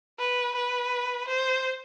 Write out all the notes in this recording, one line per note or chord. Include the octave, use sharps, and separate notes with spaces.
B4
B4
C5